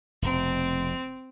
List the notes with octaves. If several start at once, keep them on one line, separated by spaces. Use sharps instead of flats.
F1 B2 C4